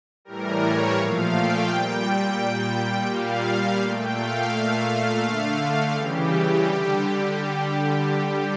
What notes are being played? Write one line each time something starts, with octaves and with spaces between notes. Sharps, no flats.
A2 E3 G3 A#4
C#5
A#2 F3 A3 F5
G5
A#2 G3
A#2 G3
A#2 G3 F5
A#2 A3 G5
F5
A#2 A3
D3 A3
C#3 E3 G3 G4
D3 G3